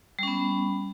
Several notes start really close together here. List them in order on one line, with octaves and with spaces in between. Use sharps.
G3 C#4 B3